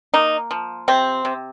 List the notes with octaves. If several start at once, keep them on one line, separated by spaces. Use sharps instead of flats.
A#3 D#4
F3
C3 C4
C3